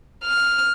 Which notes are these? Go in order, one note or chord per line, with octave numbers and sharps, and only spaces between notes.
F6